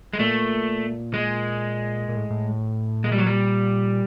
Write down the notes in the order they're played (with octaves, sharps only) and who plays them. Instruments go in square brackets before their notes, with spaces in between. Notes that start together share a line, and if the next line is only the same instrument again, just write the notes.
[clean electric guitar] G#3
[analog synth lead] A#2 [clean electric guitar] A3
[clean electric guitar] G#3
[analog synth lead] A#2
A2
A2
[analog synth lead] A#2 [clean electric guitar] G#3
[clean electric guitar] G3
F#3
G3